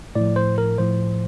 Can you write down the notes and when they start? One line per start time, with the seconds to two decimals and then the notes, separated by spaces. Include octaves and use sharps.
0.15 A2 F3 D5
0.36 C5
0.58 A#4
0.78 A2 F3 C5